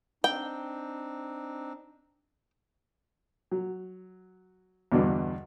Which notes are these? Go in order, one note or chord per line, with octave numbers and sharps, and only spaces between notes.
C4 D4 D#4 G5
F#3
E2 G2 B2 D3